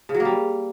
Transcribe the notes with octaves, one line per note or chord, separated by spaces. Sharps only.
C#3
F#3
A#3
G3